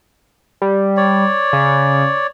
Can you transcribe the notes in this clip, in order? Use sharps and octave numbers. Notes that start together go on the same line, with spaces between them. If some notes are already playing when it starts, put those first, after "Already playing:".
G3
C#5 D5
C#3